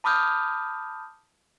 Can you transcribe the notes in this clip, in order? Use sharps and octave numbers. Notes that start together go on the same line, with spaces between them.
A5 B5 D6 D#6 F6 G6